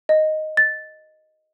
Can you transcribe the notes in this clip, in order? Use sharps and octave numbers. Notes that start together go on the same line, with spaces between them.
D#5
A6